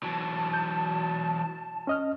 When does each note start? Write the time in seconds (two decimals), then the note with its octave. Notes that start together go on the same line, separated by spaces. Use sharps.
0.03 E3 F#3 A5
0.53 G6
1.87 C#4 D#5 F6